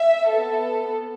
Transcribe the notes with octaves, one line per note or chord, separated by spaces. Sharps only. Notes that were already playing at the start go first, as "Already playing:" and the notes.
Already playing: E5
B3 A4